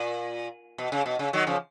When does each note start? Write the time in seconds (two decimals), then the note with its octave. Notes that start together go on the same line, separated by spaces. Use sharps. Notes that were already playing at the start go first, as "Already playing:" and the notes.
Already playing: A#2
0.78 B2
0.92 C#3
1.06 B2
1.19 C#3
1.33 D#3 F#3
1.47 C#3 F3